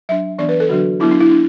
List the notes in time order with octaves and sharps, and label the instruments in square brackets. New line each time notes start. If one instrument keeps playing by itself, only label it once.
[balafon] F#3 D4 E5
E3 B3 D4 D5
B4
A4
D3 F#3 D4 F#4
F#3 B3 D4 E4
D4
E4
D4